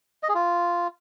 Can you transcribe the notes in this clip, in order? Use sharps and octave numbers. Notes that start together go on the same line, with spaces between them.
D#5
G#4
F4